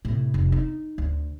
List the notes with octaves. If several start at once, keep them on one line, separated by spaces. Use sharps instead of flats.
A2 C3
F1
D#4
D2